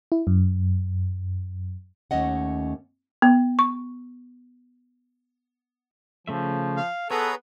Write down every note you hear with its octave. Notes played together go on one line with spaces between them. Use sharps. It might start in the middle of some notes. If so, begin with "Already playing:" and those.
E4
F#2
D#2 A3 C#4 D#5 F#5
B3
C#6
C#3 F3 A3 E5
F5
B3 G#4 A4 B4 C#5 A#5